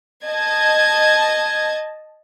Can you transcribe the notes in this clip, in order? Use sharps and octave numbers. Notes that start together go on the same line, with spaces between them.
D#5 A5 G#6